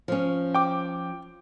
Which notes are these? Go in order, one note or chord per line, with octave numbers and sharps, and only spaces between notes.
F3 C#4
G5 D6